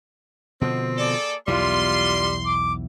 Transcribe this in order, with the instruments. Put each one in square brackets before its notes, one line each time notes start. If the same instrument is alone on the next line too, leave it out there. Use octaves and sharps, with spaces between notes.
[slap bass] B2 D3 F3 [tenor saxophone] C4
[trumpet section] A#3 G#4 A4 [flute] D5
[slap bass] B1 E2 E3 [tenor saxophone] G3 [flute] F4 [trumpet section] C6
[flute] D6